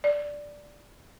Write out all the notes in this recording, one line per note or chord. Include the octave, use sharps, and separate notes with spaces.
D5